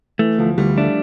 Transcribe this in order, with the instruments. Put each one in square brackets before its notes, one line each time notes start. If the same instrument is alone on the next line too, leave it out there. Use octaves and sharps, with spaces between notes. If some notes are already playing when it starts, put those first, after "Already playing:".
[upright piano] E3 [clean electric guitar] A3
[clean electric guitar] D2 [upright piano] F3
[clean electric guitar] D2 [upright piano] G3
[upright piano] A3 [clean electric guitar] D4